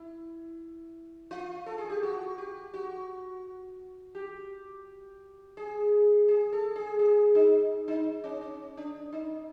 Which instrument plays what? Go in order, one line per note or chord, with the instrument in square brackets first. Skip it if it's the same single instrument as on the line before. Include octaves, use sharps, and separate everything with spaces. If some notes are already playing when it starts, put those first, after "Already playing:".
Already playing: [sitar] E4
F4
A4
G#4
G4
F#4
G4
F#4
G4
G#4
G#4
A4
G#4
G#4
D#4
D#4
C#4
C#4
D4
D#4